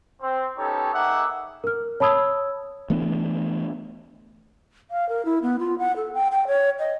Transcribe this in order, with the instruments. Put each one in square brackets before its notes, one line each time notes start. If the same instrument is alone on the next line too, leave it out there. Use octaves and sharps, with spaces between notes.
[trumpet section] C4
B3 C#4 D#4 G4 A4 C#5
A#3 D#4 G#4 E5 F#5 D6
[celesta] A#4 F6
C#5 A5 B5 D#6 E6 G#6
[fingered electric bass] E3 A3 B3 D4
[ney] F5
A#4
E4
B3
F4
F#5
A4
G5
G5
C#5
D#5